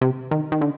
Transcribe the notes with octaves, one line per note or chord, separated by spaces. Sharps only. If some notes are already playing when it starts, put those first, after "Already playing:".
C3
D#3
D#3
D3